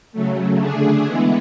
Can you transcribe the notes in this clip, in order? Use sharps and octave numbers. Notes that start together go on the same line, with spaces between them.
C#3 F#3 A3
D3 A3 D4 G#4
E3 G#3 B3